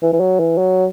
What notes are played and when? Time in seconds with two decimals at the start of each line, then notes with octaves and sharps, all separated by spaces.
0.03 E3
0.13 E3
0.20 F#3
0.39 E3
0.58 F#3